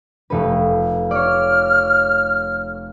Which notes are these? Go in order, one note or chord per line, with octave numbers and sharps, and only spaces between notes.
F1 A4 B4
C#5 D5 F6